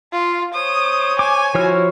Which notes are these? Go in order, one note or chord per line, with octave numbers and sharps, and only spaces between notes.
F4
C5 C#5 D#6
G#5 D6
F3 E4 F#4 C#5 F6